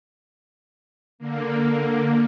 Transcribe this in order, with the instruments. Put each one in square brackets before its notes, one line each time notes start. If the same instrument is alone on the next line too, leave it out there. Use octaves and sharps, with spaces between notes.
[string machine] D3 A#3